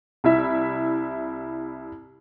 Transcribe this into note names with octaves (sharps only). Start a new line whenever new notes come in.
C2 E4 E5